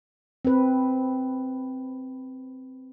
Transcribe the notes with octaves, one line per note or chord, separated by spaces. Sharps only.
C4 B4